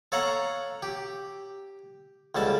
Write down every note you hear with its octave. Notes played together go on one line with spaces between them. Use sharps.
A4 C#5 F5 F#5 A#5
G4
C#2 D3 G3 A5